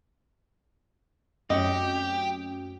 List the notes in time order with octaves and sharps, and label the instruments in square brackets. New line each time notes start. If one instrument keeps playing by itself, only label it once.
[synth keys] F#2 [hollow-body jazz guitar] A3 C4 C#5 [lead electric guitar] G4 [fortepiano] D#5